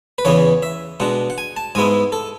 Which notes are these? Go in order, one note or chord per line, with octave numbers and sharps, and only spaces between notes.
B4
E2 C#3 E3 B3 C#5
E5
B2 G#3 D4 F#5
F#5
G#5
A5
G#2 G#3 B3 E4 G#5
A4